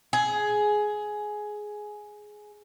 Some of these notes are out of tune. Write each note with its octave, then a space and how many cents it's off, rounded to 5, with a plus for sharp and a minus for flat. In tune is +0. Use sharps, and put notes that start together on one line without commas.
G#4 +10